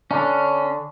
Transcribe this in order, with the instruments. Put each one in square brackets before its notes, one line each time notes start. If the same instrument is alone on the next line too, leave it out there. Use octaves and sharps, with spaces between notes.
[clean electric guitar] D3 D4 [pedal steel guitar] C#4